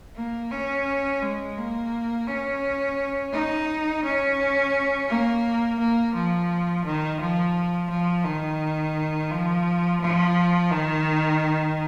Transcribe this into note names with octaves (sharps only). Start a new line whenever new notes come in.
A#3
C#4
G#3
A#3
C#4
D#4
C#4
A#3
A#3
F3
D#3
F3
F3
D#3
F3
F3
D#3